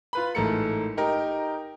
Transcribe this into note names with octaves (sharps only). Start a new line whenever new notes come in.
F4 B4 B5
A1 G#2 A3 A#4 C#7
D#4 G4 A#4